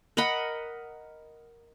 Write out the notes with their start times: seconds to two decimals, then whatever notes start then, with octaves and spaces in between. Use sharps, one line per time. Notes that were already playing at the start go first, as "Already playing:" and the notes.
0.17 A#4 D#5 F#5 B5